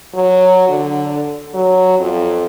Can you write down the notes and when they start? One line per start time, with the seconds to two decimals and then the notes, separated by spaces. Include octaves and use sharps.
0.14 F#3
0.69 D3
1.54 F#3
2.00 F2